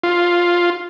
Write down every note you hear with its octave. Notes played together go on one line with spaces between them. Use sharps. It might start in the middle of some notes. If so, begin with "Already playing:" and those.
F4